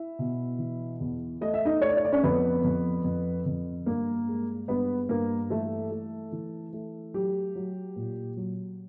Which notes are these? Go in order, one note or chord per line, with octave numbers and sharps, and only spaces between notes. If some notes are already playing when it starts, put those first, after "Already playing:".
Already playing: E4 E5
B2
E3
E2
A3 D#5
E5
D#4 D#5
A3 C#5
D5
C#5
D5
C#4 C#5
F2 B3 B4
F2
F2
F2
G2 A#3 A#4
G#3
G2 B3 B4
G2 A#3 A#4
E3 A3 A4
A3
E3
A3
F#3 G4
F#3
A#2
F#3